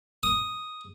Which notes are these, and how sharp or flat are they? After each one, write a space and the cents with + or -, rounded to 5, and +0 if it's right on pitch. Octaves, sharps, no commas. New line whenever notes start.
D#6 +0